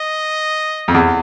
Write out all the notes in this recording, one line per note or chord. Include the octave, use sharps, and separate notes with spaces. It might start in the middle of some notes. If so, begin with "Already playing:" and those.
Already playing: D#5
F2
E2